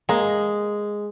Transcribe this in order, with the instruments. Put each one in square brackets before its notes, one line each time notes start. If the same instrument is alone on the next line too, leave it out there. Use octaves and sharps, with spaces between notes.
[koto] G#3 [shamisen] A#3